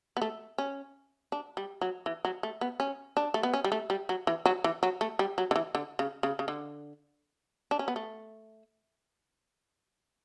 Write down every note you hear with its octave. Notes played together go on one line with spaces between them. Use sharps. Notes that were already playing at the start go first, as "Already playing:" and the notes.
B3
A3
C#4
D4
G3
F#3
E3
F#3
A3
B3
C#4
D4
A3
B3
C#4
G3
A3
G3
F#3
E3
F#3
E3
F#3
A3
G3
F#3
D3
E3
D3
C#3
C#3
C#3
D3
D4
C#4
B3
A3